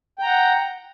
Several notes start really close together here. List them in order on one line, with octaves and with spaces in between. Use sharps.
G5 A#5 F#5